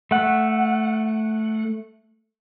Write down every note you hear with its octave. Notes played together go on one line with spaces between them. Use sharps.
A3 F#5